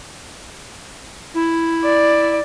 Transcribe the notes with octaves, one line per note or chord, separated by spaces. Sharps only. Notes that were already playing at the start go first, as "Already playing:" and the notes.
E4
D5